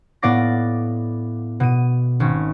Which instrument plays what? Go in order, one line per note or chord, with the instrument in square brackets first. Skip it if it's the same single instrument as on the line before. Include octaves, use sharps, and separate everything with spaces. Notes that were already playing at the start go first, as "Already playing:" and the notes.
[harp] A2 B3 D5 F5 D6 A#6
B2 D#7
G#1 C#4